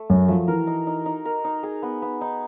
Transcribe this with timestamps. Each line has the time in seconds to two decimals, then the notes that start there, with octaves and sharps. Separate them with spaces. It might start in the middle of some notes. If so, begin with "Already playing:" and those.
Already playing: A3
0.10 F#2 F#3 F#4
0.28 F3 A3
0.48 E3 A#4
0.67 D#4
0.87 D#4
1.06 D#4
1.25 A#4
1.44 D#4
1.63 G#4
1.82 B3
2.02 B3
2.21 D#4